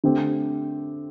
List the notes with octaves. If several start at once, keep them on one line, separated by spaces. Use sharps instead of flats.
D3 A3 C4 G4